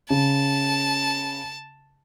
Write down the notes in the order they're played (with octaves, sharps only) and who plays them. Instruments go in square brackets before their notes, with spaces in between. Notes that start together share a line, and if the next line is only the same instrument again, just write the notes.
[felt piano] C#3 [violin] A5